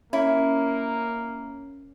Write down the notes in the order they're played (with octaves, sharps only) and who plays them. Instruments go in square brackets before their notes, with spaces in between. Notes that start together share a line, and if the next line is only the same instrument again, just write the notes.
[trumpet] A#3 [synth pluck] C#4 [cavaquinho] E4